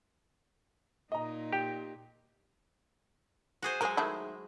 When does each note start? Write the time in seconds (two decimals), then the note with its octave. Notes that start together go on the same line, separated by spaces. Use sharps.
1.12 A#2 D#4 D#5 A#5
1.53 G4 G5
3.62 F#4 G#4 C5
3.81 F#3 G#3 G#4 A#4
3.97 D#3 A3 E4